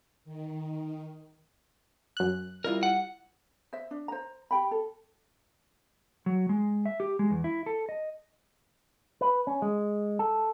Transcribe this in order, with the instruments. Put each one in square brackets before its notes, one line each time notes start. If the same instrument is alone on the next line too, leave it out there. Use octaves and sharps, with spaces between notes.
[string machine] D#3
[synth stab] F#2 F#6
[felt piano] G3 E4 F4 [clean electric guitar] A#4
[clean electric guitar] F#5
[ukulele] C5 E5
D4
C5 A#5
G4 G5 B5
A4
[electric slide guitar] F#3
G#3
E5
G4
G#3
E2
E4
A4
D#5
[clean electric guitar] B4
C#4
G#3
A4